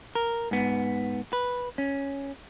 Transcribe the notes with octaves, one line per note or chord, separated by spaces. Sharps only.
A#4
G#2 B3
B4
C#4